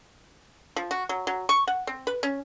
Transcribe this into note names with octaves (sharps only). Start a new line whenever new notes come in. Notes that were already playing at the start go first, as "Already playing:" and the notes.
F3
F#4
F#3
F#3
C#6
F#5
C4
B4
C#4